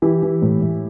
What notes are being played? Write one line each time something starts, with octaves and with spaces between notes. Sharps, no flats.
E3 E4 G4
E3
A2
A2